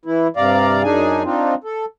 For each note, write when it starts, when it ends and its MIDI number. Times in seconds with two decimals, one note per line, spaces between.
0.05 0.27 52
0.05 0.27 64
0.37 0.82 43
0.37 0.82 48
0.37 0.82 74
0.37 0.82 77
0.37 0.82 82
0.84 1.23 42
0.84 1.23 62
0.84 1.23 63
0.84 1.23 68
0.84 1.23 80
1.24 1.54 60
1.24 1.54 62
1.24 1.54 63
1.24 1.54 65
1.64 1.85 69